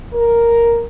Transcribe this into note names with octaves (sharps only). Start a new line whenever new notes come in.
A#4